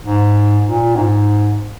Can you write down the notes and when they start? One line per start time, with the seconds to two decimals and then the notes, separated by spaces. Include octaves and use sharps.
0.04 G#2
0.65 A#2
0.96 G#2